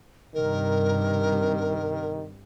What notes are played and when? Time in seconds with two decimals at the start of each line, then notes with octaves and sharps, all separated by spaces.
0.34 G2 C3 D#3 A#4